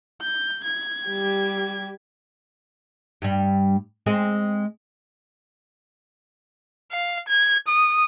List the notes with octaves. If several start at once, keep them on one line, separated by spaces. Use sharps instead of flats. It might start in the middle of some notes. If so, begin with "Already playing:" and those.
G6
G#6
G3 G4
G2 G3
G#3 C4 G#4
F5
G#6
D#6